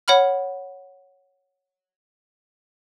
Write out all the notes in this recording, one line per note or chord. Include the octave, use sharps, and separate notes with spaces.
C#5 F#5 B5 F6